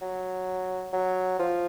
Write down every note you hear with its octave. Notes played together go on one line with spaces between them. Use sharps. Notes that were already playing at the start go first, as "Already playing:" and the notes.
F#3
F#3
F3